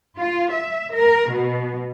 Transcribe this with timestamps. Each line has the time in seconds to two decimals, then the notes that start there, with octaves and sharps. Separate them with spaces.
0.16 F4
0.51 E5
0.94 A#4
1.29 B2